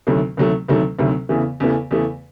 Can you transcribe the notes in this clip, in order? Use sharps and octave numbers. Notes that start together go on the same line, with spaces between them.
D2 C3 D#3 F#3 A3
D2 C3 D#3 F#3 A3
D2 C3 D#3 F#3 A3
D2 C3 D#3 F#3 A3
E2 C#3 E3 A3
E2 C#3 E3 A3
E2 C#3 E3 A3